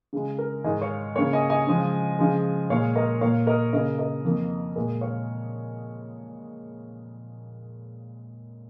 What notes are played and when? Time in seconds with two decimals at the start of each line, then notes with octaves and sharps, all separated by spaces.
0.13 C#3 G#3 G#4
0.38 A#4
0.64 G#2 D#3 G#3 D#5 G#5
0.81 C#5 F5
1.16 C#3 A#3 C#5 F5
1.33 D#5 G#5
1.50 D#5 G#5
1.67 C#3 F3 G#3
2.19 C#3 F3 G#3
2.70 A#2 G#3 C#5 F5
2.96 A#4 D#5
3.21 A#2 A#3 C#5 F5
3.47 A#4 D#5
3.73 C#3 A#3 A#4 D#5
3.98 A#4 D#5
4.24 F2 D#3 A#3
4.76 A#2 G#3 A#4 D#5
5.01 C#5 F5